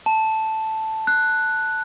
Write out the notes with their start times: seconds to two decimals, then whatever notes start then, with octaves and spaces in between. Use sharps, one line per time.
0.06 A5
1.07 F#6